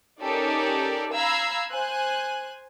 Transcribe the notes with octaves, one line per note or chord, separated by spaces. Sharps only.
C#4 D#4 G4 A4 A#4 D5
F5 A#5 B5 E6 G#6 C7
C5 G#5 F#6